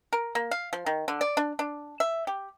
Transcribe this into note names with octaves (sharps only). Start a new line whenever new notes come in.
A#4
A#3
F5
F3
D#3
D3
D5
D4
D4
E5
G4